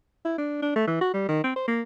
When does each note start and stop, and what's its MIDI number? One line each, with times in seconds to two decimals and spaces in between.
0.25 0.35 64
0.38 0.59 62
0.62 0.74 62
0.76 0.84 57
0.88 1.00 52
1.01 1.11 66
1.14 1.24 55
1.29 1.44 51
1.44 1.53 60
1.56 1.65 72
1.68 1.82 58